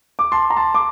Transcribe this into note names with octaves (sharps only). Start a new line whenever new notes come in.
D6
A5 C6
A#5
A5 C6
D6